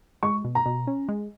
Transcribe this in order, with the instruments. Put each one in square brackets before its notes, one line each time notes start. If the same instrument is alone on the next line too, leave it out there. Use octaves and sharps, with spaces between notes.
[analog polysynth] G#3 [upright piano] C#6
[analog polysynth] B2
[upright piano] A#5
[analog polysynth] B2
C#4
G#3